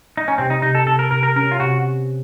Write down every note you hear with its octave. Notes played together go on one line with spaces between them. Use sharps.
D#4
C#4
C3 C4
D#4
C3 D#4
A4
C3 A4
A#4
C3 A#4
A#4
C#4 A#4
F4
C3 F#4